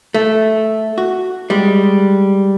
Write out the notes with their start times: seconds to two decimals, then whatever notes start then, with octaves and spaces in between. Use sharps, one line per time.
0.14 A3
0.98 F#4
1.50 G3 G#3